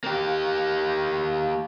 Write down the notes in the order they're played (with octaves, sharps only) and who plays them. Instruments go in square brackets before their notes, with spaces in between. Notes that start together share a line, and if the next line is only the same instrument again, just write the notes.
[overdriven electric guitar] A#3 G4